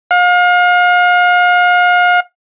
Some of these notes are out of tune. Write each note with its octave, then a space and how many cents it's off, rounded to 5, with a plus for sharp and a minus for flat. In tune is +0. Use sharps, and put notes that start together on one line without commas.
F5 +35